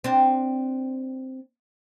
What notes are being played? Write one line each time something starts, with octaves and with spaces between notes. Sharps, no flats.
C4 D4